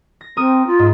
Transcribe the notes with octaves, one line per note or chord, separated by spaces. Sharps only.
A#6
C4 A#4 D#6
F4
G#2